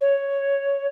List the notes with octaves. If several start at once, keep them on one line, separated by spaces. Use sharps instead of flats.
C#5